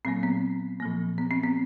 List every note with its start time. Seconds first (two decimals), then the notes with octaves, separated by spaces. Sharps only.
0.05 A#2 F#3 A#3 C4
0.23 B3
0.80 A#2 F3 A#3
1.18 B3
1.31 C4
1.43 B3